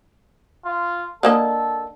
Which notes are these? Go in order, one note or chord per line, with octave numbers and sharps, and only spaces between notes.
F4
D3 A#3 A4 D#5